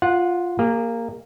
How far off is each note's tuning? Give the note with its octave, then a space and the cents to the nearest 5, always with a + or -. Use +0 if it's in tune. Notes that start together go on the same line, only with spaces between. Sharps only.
F4 +0 F#5 -15
A#3 -10 G#4 -45